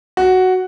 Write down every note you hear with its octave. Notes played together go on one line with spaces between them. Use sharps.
F#4